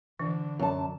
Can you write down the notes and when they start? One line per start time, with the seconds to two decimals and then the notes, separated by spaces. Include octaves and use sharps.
0.19 D3 E3 D4
0.59 F#2 A5